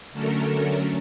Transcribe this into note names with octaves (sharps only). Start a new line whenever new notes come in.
D3 F#3 A3 C#4 A4 A#4